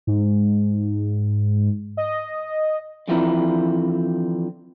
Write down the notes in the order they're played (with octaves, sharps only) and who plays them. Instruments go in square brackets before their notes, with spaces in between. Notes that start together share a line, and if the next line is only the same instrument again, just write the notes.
[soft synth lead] G#2
D#5
[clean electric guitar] D3 E3 F3 C4 E4 A#4